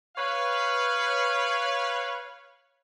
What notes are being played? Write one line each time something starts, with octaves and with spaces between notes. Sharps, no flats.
B4 C#5 F5